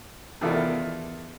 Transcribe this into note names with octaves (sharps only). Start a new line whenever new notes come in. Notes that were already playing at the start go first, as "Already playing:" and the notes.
E2 D#3 E4 F4 A4 D5